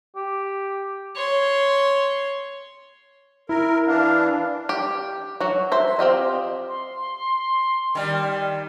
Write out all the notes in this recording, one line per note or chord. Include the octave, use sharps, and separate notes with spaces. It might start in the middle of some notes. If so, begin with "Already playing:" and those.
G4
C#5 C6
E4 A#4
E3 D4 F5
G4
F#3 F#4
C5 E5
C4 F4 G4 D#5
C6
D#3 G3